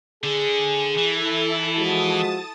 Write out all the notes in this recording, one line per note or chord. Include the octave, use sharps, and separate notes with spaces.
D3 G#4
E3 E4 A4
F3 G#3 F#4 A5 D#6 A6